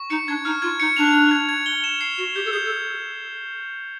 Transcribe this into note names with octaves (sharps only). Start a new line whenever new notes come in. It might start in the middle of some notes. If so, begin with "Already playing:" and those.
Already playing: C#6
D#4 C#7
D4 G#6
D#4 F6
F4 G#6
D#4 C#7
D4 F7
F7
G#6
G#6
G7
E7
C7
F#4 E7
G4 G6
A4
G#4 G6
A4